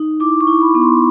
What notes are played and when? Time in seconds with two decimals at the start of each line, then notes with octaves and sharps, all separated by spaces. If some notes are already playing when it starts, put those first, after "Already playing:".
Already playing: D#4
0.20 E4 D6
0.41 C#6
0.47 E4
0.61 B5
0.75 B3
0.82 C6